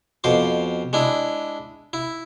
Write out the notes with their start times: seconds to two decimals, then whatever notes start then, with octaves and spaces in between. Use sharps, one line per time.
0.24 F2 B2 C5 D6
0.93 G#3 D4 E4
1.93 E4